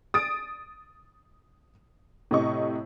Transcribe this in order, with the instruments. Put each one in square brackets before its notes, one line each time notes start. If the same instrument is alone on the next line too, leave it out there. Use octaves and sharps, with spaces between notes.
[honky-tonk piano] D#6 A6 D7
A2 C3 D#5 C#6